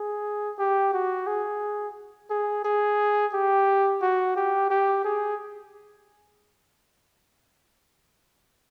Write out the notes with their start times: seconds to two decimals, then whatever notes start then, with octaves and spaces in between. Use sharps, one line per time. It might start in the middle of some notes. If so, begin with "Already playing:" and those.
Already playing: G#4
0.59 G4
0.93 F#4
1.27 G#4
2.30 G#4
2.65 G#4
3.34 G4
4.02 F#4
4.36 G4
4.70 G4
5.05 G#4